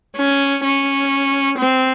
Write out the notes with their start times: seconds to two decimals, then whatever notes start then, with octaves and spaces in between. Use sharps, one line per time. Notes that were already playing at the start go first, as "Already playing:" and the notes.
0.17 C#4
0.64 C#4
1.58 C4